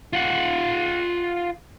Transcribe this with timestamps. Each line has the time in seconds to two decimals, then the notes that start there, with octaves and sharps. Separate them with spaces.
0.13 F4 F#5